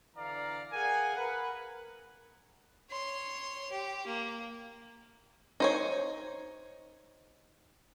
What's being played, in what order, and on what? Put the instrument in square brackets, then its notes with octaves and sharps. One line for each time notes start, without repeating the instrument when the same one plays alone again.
[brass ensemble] D3 E3 D5 F5 A#5
G#4 A#4 F5 F#5 G#5
A#4 B4 F#5
[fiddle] C#5 C6
G4
A#3
[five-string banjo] D#4 C5 C#5